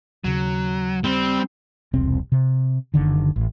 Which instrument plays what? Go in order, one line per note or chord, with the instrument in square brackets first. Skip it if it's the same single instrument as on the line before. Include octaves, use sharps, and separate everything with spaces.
[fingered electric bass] D#2 C#3 [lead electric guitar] F#3
[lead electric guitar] G3 [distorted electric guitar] C4
[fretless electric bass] E1 C2 C4
C3
F#1 D3 D#3
A1